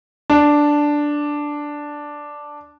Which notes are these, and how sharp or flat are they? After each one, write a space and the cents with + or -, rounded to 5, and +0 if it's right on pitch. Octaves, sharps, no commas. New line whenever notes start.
D4 +0